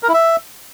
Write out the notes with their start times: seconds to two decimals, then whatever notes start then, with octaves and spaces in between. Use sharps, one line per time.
0.03 A#4
0.08 E4
0.14 E5